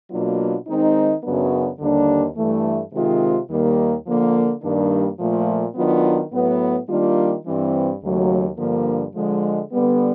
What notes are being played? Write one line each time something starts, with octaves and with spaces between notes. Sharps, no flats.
B2 F#3 A#3 D4 F4
D#3 G#3 C4 D#4
F#2 C#3 F#3 B3 D4
D#2 D3 G3 A#3 D4
G2 E3 A3
C3 D#3 G#3 C4 F4
D#2 D#3 G3 A#3
D3 F3 A#3
G2 D#3 G3 A#3 D4
A#2 F3 A3
D#3 F#3 B3 D4 F4
A2 F#3 B3
D#3 G3 A#3 D4 F4
G2 E3 G3 C4
D#2 C#3 F#3 A3
G2 D3 F3 A#3
D3 F3 G#3
D3 G3 B3